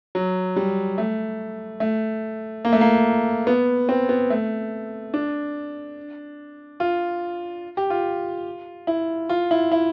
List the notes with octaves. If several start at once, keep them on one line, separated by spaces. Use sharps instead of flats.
F#3
G3
A3
A3
A#3
A3
A#3
B3
C4
B3
A3
D4
F4
G4
F4
E4
F4
E4
E4